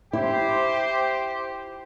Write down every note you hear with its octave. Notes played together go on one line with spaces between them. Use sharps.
E4 G4 C5